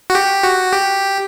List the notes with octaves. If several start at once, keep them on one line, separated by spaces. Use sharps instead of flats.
F#4
G4
F#4
G4